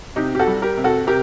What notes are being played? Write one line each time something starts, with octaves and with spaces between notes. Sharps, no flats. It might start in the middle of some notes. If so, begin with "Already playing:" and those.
C3 D#4 G4
G4
F#4 A4
G3
G4 A#4
C3
F#4 A4
C3 G4 A#4